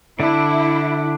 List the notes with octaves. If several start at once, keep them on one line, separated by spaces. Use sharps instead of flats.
D3 D4 E4